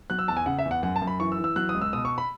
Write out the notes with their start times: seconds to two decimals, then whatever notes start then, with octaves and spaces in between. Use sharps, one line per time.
0.10 F#3 F#6
0.19 E6
0.28 E2 A5
0.37 G#5
0.46 C#3 F#5
0.59 E5
0.65 E2
0.71 F#5
0.83 F#2 F#5
0.96 A5
1.02 F#2
1.07 B5
1.20 E3 C#6
1.32 E6
1.39 E3
1.44 E6
1.56 F#3 F#6
1.69 D#6
1.74 C#2
1.81 E6
1.93 B2 D#6
2.05 C#6
2.18 B5